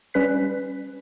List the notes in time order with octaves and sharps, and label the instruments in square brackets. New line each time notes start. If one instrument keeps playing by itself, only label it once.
[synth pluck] G3 C#4 B4 F#6 B6